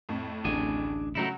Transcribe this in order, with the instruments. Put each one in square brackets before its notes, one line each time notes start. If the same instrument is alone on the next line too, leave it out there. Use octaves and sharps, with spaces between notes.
[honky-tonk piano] F2 A2
[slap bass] A1 D2 [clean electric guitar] D4 G#4 G#5
[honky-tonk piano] C#3 F#3 F#4 [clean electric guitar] A3 D#4 E4